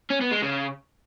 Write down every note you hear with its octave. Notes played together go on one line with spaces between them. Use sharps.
C#4
B3
G#3
C#3